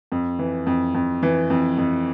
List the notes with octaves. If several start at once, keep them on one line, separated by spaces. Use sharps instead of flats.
F2
E3
F2
F2
E3
F2
F2